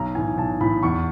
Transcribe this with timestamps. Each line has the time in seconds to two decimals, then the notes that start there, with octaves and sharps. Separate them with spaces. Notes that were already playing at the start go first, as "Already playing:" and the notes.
Already playing: B1 A#5
0.14 A2 E3 G#5
0.37 B1 A5
0.61 A2 E3 B5
0.83 E2 C#6